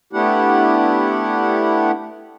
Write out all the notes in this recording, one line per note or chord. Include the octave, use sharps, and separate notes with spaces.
A3 B3 D4 E4 G4 F#5